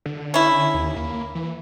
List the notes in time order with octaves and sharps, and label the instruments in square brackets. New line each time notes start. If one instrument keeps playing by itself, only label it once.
[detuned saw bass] D3
[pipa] C#4 E4
[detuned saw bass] D#2
A#3
E3